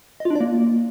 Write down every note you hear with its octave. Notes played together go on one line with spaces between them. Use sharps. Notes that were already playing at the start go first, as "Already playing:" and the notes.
D#5
F4
D4
D5
A#3